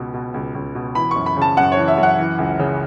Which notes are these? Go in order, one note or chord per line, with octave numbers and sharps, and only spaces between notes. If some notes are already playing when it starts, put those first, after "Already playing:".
Already playing: C#2 B2
B2
C#2
C#2
B2
E3 B5
F#2 C#6
B5
C#3
A5
F#2 F#5
E3 C#5
E5
F#2
F#5
E3
C#2
C#3